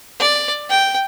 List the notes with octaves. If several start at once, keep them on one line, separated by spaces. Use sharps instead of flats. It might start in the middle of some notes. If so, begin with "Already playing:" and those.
D5
G5